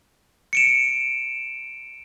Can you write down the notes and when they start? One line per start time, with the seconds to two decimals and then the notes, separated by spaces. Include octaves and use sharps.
0.53 C#7 D7 E7